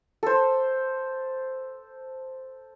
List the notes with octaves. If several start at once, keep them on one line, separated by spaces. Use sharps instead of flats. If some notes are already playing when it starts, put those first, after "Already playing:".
A4 C5